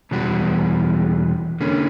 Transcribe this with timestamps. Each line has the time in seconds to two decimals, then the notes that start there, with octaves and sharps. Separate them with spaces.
0.11 E2 B2 G3 B3 F#4
1.61 D3 A#3 C#4